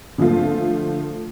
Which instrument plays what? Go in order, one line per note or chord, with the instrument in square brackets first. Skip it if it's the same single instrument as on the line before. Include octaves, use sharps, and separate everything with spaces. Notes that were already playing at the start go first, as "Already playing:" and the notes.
[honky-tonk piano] D3 F3 A3 F4